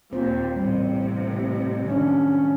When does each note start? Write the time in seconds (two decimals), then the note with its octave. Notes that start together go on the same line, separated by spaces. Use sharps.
0.13 D#2 A#2 C4 C5
0.56 A1 C3 G3 A#3
1.85 D#3 F#3 C#4 D4